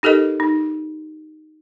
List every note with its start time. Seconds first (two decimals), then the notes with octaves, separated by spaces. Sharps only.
0.03 D#4 G4 A4 A#4 D#5
0.40 D#4